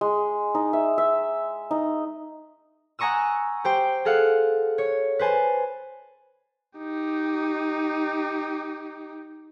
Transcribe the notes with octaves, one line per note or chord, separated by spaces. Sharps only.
G#3
D#4
E5
E5
D#4
F#5 G#5 A#5 C#6 D#6 E6
G4 C5 G5
G#4 A4 F5 F#5
C#5
B4 C5 G#5 A5
D#4 G4